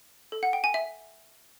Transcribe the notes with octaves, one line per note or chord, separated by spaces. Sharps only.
A4
F#5
G5
G#5
E5